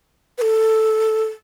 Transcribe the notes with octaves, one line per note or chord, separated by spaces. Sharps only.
B4
A4